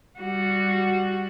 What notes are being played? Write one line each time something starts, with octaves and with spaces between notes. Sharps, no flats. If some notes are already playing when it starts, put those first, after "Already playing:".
G3 F#4